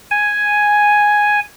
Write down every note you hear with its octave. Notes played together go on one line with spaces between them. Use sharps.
G#5